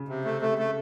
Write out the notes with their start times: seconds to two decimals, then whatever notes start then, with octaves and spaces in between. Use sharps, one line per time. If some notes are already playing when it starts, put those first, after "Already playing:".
Already playing: C#3
0.08 C3
0.25 A3
0.42 A3
0.58 A3